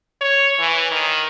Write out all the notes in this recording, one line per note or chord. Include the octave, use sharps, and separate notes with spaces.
C#5
E3
D#3